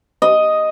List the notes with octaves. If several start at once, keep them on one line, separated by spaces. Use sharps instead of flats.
D#5